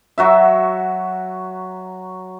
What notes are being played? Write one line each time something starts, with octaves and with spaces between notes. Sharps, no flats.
F#3 F#4 E5